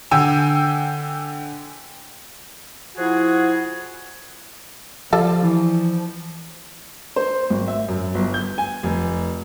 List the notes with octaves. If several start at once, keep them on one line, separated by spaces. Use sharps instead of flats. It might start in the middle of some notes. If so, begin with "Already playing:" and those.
D3 G5 G#5 E6
F3 E4 F#4 G#4 F#5
F3 G3 F4 A4
E3
C5
G#1
E5
F#2
G1
G6
G#5
F1